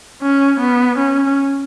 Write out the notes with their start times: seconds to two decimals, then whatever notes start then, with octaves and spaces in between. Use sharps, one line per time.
0.22 C#4
0.61 B3
0.99 C#4